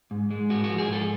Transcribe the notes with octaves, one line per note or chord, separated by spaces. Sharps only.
G#2
G#3
G#2 F#4
F#4
F3
G#4
G#2 A4